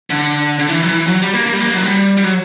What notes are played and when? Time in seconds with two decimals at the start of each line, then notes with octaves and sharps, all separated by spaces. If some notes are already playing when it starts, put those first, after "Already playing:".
0.10 D3
0.59 D3
0.69 E3
0.83 F#3
0.88 E3
1.07 F#3
1.22 G3
1.34 A#3
1.46 A#3
1.53 G3
1.60 A#3
1.73 F#3
1.85 G3
2.17 G3
2.23 F#3